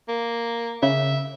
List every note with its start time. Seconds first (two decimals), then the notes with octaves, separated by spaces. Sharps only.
0.09 A#3
0.83 C#3 E5